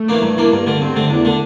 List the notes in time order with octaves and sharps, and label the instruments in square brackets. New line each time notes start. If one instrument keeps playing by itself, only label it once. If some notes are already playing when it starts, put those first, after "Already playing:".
Already playing: [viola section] A3
[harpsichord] E3 A#3 D4
G2
E3 A#3 D4
[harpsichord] G2 [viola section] A#3
[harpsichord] D3 A3
[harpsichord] G2 [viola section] C4
[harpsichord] D3 A3
[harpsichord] E2 [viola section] D4
[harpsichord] D3 A3